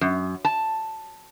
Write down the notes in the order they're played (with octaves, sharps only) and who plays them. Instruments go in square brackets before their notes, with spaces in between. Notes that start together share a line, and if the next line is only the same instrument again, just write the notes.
[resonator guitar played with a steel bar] F#2
A5